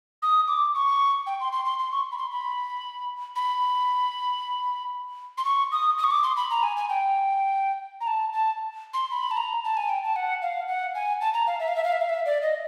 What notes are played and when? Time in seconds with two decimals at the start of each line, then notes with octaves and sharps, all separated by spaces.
0.23 D#6
0.48 D6
0.75 C#6
1.27 G5
1.41 C6
1.53 C6
1.65 C6
1.79 C6
1.92 C#6
2.12 B5
2.18 C6
2.32 B5
3.36 B5
5.38 C6
5.45 C#6
5.72 D#6
5.98 D#6
6.04 C#6
6.11 D6
6.23 C6
6.37 B5
6.50 A#5
6.63 G#5
6.76 G#5
6.89 G5
8.01 A#5
8.07 A5
8.33 A5
8.94 C6
9.11 B5
9.31 A5
9.37 A#5
9.64 A5
9.77 G#5
9.89 G5
10.04 A5
10.16 F#5
10.42 F5
10.68 F#5
10.95 G#5
11.21 A5
11.34 A#5
11.47 F5
11.60 E5
11.68 F5
11.76 E5
11.84 F5
11.92 E5
12.01 F5
12.09 E5
12.26 D5
12.42 D#5